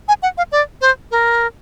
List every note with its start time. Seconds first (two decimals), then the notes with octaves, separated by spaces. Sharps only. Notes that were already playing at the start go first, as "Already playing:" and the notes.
0.08 G#5
0.22 F#5
0.37 F5
0.52 D5
0.81 C5
1.11 A#4